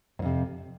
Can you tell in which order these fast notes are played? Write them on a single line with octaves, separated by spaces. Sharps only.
G#2 F2 C3